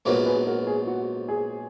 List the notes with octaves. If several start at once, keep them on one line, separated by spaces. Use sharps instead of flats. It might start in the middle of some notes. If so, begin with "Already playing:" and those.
A#1 G#2 F#3 B3 A#4 C#5
G#4 B4
B4
F#4 A#4
G#4
F#4
G#4